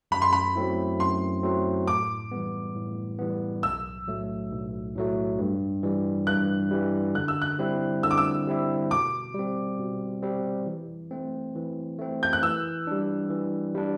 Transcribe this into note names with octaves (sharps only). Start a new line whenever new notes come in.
F#2 B5
C6
B5
F#3 A3 C4 E4
F#2 C6
F#3 A3 C4 E4
A2 D6
E3 G3 B3
A2
E3 G3 B3
B1 E6
A2 F#3 A3
B1
A2 F#3 A3
G2
E3 G3
G2 F#6
E3 G3
D3 F#6
E6
F#6
G3 C4 E4
D3 E6
D6
E6
G3 C4 E4
B2 D6
G3 C4
B2
G3 C4
E3
A3 C4
E3
A3 C4
G6
F#6
E3 E6
G3 D4
E3
G3 D4